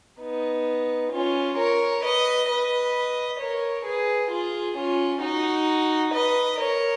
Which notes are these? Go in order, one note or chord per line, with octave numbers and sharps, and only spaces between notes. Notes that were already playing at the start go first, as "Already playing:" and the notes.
B3 D#4
C#4 F4
A#4 C#5
B4 D#5
B4 D#5
A#4 C#5
G#4 B4
F4 G#4
C#4 F4
D#4 F#4
B4 D#5
A#4 C#5